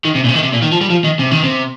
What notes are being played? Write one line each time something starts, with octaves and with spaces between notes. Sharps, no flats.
D#3
C3
A#2
C3
D#3
C3
A#2
D#3
F3
G3
F3
D#3
C3
D#3
C3